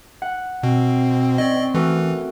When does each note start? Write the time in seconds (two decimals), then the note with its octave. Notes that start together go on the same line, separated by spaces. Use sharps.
0.22 F#5
0.63 B2 C4
1.38 C#4 D5 D#5
1.75 E3 A3 F#4 A#4